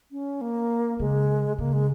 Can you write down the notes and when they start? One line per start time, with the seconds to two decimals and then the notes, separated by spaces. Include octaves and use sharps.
0.11 C#4
0.41 A#3
0.99 C#3 G#3
1.58 C#3 A#3
1.73 G#3